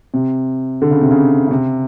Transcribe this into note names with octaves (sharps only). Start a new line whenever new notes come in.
C3
D3
C#3
C3
C#3
C#3
C3